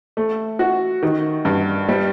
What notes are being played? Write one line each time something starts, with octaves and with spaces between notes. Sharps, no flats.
A3
F#4
D#3
G2
G3